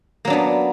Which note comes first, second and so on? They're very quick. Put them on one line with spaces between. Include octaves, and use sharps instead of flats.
A#3 F#3 D4 B3